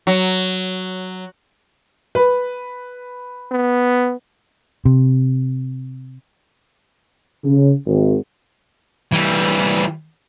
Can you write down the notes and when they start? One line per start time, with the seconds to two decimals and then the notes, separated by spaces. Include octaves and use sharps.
0.07 F#3
2.15 B4
3.52 B3
4.85 C3
7.44 C#3
7.86 G#1
9.12 E3 G3